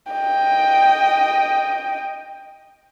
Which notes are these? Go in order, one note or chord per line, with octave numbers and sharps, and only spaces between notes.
D#5 G5